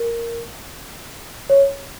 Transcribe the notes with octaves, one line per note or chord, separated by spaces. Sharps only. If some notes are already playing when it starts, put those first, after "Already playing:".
Already playing: A#4
C#5